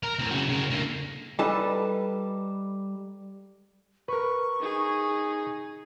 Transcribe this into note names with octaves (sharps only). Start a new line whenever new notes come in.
A#4
A2 C4
C#3 F#4
C#3 A#4
D3 A#3
G3 D#4 A4 B4 A5
A#4 B4 C#6
D#4 G#4